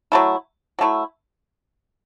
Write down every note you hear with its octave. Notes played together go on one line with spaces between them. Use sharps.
F#3 A3 E4
F#3 A3 E4